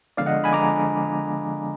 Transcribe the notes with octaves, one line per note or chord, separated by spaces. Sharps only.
D3 F3 G#3 B3 D4 D5 F5
D#5 F#5
G#5 B5
D3 F3 G#3 B3 D4 A#5 D6